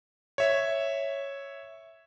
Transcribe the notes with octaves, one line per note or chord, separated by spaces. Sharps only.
C#5 E5